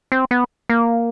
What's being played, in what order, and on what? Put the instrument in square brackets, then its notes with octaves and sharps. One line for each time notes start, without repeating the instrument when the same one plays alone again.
[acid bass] C4
B3
A#3